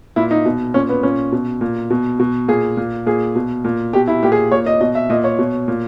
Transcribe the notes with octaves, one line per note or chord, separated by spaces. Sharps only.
A#2 E4
D#4
B2
A#2 C#4
B3
A#2 C#4
B2
A#2
B2
B2
A#2 G#4
A#2
A#2 G#4
B2
A#2
B2 G4
E4
A#2 G4
G#4
A#2 C#5
D#5
B2 D#5
E5
A#2 D#5
C#5
B2
A#2